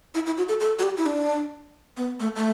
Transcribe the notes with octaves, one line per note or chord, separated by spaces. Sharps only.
E4
E4
F#4
A4
A4
F#4
G4
E4
D4
B3
A3
A3